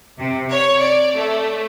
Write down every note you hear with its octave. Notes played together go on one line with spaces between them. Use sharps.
C3
C#5
D5
A3